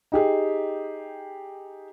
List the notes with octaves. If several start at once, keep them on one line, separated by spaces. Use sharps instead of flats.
D#4 G4 G#4